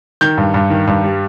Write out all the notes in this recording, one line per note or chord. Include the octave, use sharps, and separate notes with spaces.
D#3 G6
G2
G2
D#3
G2
G3